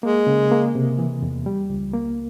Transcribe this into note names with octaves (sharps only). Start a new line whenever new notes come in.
G#3 A#3
C#3
A#3
C3
E3
E2
G3
C#2
A#3